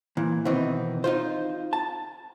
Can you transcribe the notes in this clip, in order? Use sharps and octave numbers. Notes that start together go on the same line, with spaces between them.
A#2 E3
B2 D#3 E3 C4 D#4
D#4 F4 C5
A5